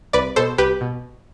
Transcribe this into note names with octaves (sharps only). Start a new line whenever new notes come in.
C2 B4 D5
B2 A4 C5
C2 G4 B4
B2